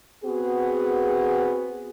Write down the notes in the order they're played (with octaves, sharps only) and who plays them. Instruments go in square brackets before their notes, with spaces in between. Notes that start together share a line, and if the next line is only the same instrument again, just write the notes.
[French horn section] B3 C4 F#4 G#4